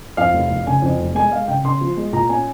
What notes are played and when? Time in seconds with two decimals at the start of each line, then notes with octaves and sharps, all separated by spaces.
0.17 F2 F5
0.34 F1
0.50 F1
0.66 C#3 G#5
0.82 F2
0.99 F1
1.15 G#3 G#5
1.31 G#3 F5
1.48 C#3 G5
1.64 C#3 C6
1.81 F3
1.97 G#3
2.13 A#2 A#5
2.29 C#4 G#5